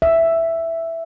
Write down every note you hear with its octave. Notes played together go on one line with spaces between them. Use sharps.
E5